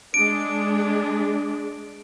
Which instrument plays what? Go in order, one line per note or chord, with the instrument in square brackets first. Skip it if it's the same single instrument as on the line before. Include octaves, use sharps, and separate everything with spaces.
[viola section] G#3 D4 [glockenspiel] D7